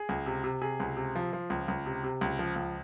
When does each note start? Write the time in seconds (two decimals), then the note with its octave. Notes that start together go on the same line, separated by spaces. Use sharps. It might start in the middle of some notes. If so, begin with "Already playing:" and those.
Already playing: G#4
0.09 C#2
0.26 C3
0.44 C3
0.61 C3 G#4
0.80 C#2
0.97 C3
1.15 F3
1.33 F3
1.50 C#2
1.68 C#2
1.86 C3
2.03 C3
2.21 C#2
2.39 F3
2.56 C#2